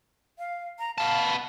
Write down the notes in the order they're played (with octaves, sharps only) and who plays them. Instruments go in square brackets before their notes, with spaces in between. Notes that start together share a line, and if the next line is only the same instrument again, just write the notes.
[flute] F5
A#5
[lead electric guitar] B3 A5 [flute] F5